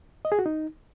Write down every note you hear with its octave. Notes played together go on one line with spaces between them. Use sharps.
D#5
G#4
F#4
D#4